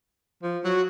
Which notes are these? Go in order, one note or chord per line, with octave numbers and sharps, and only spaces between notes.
F3
F#3 F#4